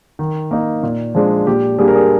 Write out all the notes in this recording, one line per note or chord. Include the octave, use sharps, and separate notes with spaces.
D#3
A#3 D#4
A#2
F3 G#3 D4
A#2 G4
G3 A#3 D4 G#4
A#4
G#4